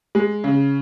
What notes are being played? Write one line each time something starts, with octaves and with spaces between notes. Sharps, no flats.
G#3
C#3